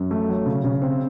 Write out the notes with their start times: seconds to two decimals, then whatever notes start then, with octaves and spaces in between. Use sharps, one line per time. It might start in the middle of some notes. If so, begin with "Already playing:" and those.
Already playing: F#2
0.11 A3
0.29 F#3
0.46 C#3
0.64 C#3
0.82 C4